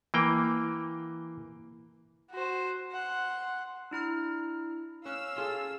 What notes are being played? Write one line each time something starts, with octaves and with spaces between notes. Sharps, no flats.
E3 A#3 G5
F#4 C5
F#5 C6
D4 E4 A#5 F6
C#4 F5 F#5 E6
F4 G#4 A4